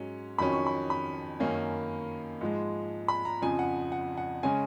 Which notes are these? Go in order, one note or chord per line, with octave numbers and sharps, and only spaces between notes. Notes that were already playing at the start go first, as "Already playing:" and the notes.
Already playing: G#2 F#3 C#4
F2 D#3 F#3 C#4 B5
C#6
B5
B5
F#2 D#3 A#3 C#4
G#2 F3 G#3
B5
A#5
F2 C#3 F3 G#5
F#5
F#5
F#5
C#3 G#3 C#4 G#5